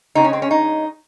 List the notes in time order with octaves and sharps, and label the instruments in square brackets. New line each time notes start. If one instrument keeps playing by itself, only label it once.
[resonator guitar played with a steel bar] C#3 G#3 C4 D#4
C#4
C4
C#4
D#4